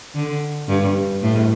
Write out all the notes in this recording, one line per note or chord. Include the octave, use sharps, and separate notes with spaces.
D3
G2
A2